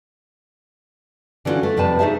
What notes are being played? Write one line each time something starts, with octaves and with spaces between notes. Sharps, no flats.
D3 E3 G3 C#4 F4 F#4
A3
F2 C3 G3 B4 A5
A3 D#4 G#4 C5 E5 A5